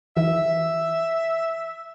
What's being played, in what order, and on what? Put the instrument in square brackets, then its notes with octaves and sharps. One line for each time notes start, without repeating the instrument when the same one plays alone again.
[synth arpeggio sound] E3 E4 [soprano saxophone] E5